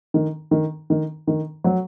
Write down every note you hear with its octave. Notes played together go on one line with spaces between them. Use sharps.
D#3
D#3
D#3
D#3
F#3